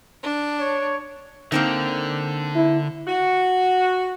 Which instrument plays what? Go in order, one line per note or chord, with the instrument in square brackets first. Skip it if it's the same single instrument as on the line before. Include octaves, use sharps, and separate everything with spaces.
[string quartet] D4
[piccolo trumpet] C#5
[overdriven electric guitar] D3 [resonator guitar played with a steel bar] A#3 C4 D#4
[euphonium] E4
[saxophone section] F#4